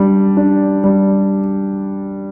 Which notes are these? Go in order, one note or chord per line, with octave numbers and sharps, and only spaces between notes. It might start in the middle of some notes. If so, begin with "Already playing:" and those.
Already playing: G3 D4
D4
G3